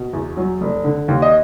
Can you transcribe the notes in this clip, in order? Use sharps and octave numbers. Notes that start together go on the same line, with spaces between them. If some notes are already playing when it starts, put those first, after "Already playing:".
Already playing: B2
E2
F#3
F1
D3
D#2
D#5